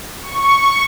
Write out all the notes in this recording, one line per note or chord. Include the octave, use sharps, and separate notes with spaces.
C#6